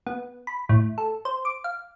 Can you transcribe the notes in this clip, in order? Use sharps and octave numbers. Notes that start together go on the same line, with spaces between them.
B3
B5
A2
A4
C5
D6
F5